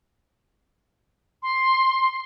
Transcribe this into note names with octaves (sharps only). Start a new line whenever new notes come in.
C6